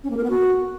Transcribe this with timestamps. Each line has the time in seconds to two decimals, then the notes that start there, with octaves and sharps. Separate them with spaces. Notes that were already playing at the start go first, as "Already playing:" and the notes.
0.04 C#4
0.10 A#3
0.17 A#4
0.24 B3
0.30 F#4